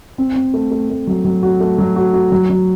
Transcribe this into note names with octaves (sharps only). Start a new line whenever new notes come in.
C4
C4
A3
A3
A3
F#3
F#3
F#4
A3
F#3
F#4
F#4
F#3
F#3